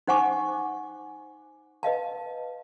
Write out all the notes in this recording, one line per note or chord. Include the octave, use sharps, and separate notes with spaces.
D#4 C5 F#5 G#5 C#6 D6
B4 D#5 F5 A5